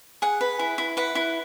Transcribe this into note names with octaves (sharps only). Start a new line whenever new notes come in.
G#4 F#5
B4
E4
E4
B4 F#5
E4